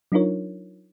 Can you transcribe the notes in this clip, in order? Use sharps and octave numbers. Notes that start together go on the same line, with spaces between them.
F#3 D4 D#4 F4 A#4 C#5